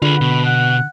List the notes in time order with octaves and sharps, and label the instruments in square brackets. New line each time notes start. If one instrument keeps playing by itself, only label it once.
[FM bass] D3 [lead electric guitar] F4 G#4 [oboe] B4
[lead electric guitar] B2
[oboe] F#5